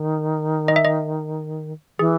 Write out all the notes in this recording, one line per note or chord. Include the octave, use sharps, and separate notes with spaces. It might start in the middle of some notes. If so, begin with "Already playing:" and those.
Already playing: D#3
D#5
E5
D#5
E3 G#4